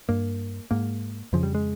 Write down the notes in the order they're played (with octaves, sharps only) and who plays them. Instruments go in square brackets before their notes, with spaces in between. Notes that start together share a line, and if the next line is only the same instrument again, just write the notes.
[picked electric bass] G2 A#3
G#2 A#3
F2 C#3 F3
G3
G#3